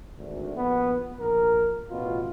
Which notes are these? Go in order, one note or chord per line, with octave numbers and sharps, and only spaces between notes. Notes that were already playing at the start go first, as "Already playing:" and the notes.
G#1 D2
A#1 B3
A#1 A#4
A1 B2 F4